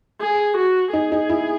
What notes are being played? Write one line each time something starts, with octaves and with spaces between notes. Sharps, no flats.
G#4
F#4
D#4 G#4
D#4
E4